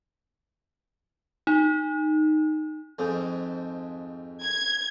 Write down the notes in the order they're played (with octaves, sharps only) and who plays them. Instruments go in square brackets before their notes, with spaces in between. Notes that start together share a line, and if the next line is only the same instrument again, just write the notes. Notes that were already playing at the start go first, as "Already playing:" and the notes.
[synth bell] D#4
[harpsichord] F2 G#2
[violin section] G#6